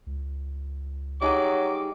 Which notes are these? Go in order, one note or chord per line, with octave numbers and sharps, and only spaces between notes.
C#2
F#3 G3 D#4 G#4 D6